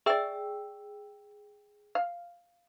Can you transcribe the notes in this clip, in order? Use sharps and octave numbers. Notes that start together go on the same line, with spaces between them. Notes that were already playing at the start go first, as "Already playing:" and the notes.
G#4 D5 E5 G5 E6
F5